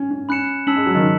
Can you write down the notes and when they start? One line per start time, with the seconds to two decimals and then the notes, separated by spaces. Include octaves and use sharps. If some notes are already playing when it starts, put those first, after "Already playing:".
Already playing: C#4
0.11 C#4
0.29 C#4 B5 F#6 C#7 E7
0.67 C#4 A5 E6 B6 F#7
0.77 G#3
0.86 F#3
0.95 D#3